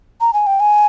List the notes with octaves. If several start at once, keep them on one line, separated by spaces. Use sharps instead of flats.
A#5
G#5
G5
G#5